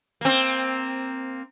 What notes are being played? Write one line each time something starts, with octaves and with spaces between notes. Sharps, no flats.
A#3 C4